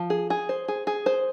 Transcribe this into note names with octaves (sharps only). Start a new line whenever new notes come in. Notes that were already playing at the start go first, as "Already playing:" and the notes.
Already playing: F3
G#4
G#4
C5
G#4
G#4
C5